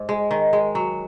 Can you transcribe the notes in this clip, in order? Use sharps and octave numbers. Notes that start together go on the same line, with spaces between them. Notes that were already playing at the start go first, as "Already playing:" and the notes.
Already playing: G#2
G#3 D#5
D#3 D#5
G#3
F#3